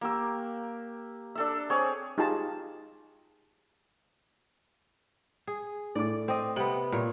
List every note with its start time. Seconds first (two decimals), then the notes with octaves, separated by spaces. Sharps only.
0.01 A#3 G4 E6
1.35 D4 A4 E5
1.70 C4 G#4 C#5 D5
2.18 D#4 F4 G4 G#4 A5 A#5
5.47 G#4
5.95 A2 D5 D6
6.28 C4 D#5
6.56 C3 B3 F#7
6.92 A#2 C#5